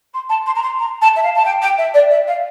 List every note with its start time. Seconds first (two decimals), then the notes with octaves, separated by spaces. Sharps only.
0.13 C6
0.29 A5
0.46 C6
0.55 A#5
0.62 C6
0.79 A#5
1.01 A5
1.16 E5
1.23 F5
1.35 A5
1.45 G5
1.61 G5
1.78 E5
1.94 D5
2.10 E5
2.27 F5